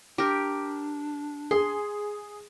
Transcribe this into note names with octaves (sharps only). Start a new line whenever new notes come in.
D4 G4 A#4
G#4 C6